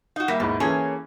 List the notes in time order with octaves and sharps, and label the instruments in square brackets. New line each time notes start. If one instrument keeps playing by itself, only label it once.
[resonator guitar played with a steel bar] D#4 F#4 [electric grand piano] F5
[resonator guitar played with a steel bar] G3 A#3 [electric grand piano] E5 A#6 B6
[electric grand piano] D#2 G#2 E4 [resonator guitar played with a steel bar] B2
[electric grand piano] E3 A4 [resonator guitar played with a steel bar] A#3 C#4 G#4